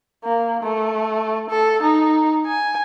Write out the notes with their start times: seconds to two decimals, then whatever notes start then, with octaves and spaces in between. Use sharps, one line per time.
0.24 A#3
0.63 A3
1.50 A4
1.82 D#4
2.47 G#5